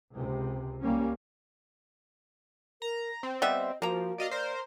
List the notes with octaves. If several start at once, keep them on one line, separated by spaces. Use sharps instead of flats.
C#2 C3
C2 G3 A#3 C#4
A#4 A#5
C4 C5
G3 B3 D#5 E5
F3 A#3 F#4 A#5
F#4 D5 D#5 F5
A#4 C5 D5